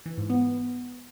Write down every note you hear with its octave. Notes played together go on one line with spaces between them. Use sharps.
E3
G#2
B3